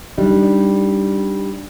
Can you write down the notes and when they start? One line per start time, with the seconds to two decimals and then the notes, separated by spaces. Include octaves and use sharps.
0.18 G3 D4 D#4